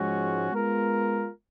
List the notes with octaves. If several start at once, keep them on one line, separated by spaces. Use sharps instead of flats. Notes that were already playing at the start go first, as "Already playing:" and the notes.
Already playing: G#2 F3 G#3 C#4 F#4
G#3 B3 F4 A#4